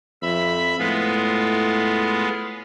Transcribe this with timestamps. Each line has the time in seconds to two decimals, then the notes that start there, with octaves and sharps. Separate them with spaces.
0.22 F2 E5 B5
0.79 A2 G#3 B3 F4